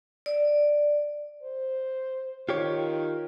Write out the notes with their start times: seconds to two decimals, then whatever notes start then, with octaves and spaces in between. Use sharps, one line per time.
0.26 D5
1.43 C5
2.49 D#3 F4 G4 C#5